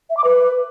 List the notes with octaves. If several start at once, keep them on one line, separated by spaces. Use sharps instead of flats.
E5
D6
B4